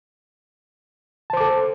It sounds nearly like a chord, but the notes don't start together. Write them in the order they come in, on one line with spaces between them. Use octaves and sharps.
A5 C5 D6 A4